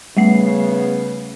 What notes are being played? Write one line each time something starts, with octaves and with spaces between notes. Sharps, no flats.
C#3 G3 A3 B3 C7